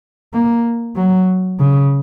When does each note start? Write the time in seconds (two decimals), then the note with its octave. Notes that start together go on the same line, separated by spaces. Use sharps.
0.33 A#3
0.96 F#3
1.59 C#3